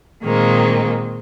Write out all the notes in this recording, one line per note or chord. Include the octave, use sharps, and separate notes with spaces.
A#2 D#3 G#3 A#3 C4